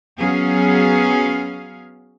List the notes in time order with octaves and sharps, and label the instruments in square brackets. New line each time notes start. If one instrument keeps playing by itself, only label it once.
[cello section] F#3 B3 C#4 G#4 F5